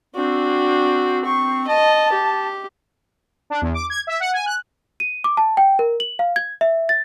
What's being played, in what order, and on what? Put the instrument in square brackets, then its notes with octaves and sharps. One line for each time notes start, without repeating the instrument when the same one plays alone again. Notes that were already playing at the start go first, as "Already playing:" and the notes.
[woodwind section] C4 [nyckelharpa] D4 F#4
[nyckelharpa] C#6
[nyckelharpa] D#5 [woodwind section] A5
[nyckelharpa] G4
[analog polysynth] D4
E2
D6
G#6
E5
F#5
G#5
F#6
[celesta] D#7
D6
A5
G5
A#4
F#7
F5
G#6
E5
A6